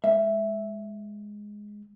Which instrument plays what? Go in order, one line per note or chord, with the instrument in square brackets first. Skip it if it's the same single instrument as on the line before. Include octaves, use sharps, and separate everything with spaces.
[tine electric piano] G#3 [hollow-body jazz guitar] E5